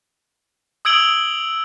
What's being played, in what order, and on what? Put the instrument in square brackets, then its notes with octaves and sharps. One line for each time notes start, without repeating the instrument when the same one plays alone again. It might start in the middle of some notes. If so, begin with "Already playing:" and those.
[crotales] D#6 E6 G#6 D7 F#7 G7